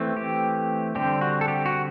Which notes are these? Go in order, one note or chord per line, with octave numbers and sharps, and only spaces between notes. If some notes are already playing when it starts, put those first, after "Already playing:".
Already playing: E3 A3 C4
G4
D3 G3 C4 G4
F#4
A4
G4
F#4